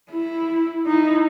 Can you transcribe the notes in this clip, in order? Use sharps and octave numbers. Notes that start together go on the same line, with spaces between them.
E4
D#4 E4